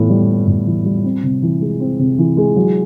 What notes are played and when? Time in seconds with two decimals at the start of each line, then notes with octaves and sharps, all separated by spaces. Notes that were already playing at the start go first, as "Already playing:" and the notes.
Already playing: A2 E3 B3
0.10 G3
0.28 B3
0.47 A2
0.66 E3
0.85 G3
1.04 C4
1.23 C3
1.42 E3
1.61 G#3
1.80 C4
1.99 C3
2.18 E3
2.37 G#3
2.56 F#3